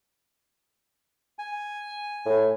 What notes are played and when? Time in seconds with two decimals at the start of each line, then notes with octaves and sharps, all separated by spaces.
1.39 G#5
2.26 A2